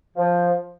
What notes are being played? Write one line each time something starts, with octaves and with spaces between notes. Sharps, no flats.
F3